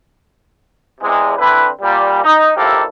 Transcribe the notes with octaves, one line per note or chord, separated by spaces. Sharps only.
E2 C3 G#3
D3 C4 E4 B4
A#2 G3
D#4
A#1 D#2 A#3 E4 G4 A4